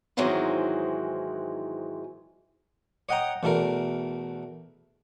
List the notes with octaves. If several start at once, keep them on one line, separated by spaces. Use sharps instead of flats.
G#2 D#3 E3 F#3 G#3 C4
C#5 D#5 F#5 G5 A#5 D#6
E2 B2 A3 A#4